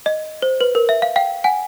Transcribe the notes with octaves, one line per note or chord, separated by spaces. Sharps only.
D#5
C5
B4
A#4
E5
F5
F5 G5
F#5 G#5